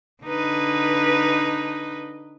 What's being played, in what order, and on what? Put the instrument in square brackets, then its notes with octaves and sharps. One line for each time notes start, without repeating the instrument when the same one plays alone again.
[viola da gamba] D3 D#4 B4